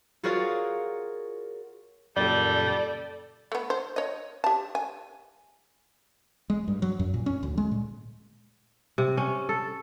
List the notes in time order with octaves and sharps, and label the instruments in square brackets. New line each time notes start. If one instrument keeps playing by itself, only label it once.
[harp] F4 F#4 G#4 A#4 C#5 D5
[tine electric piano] F#2 A#2 C#3 [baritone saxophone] G3 [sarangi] A4 [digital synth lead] D5
[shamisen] A3 B3
C5
C#5 D#5
G4 A5
G#5
[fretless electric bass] G#3
G2
F#3
F#2
A#2
C#4
D2
G#3
A#2
[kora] C3
C#4
A4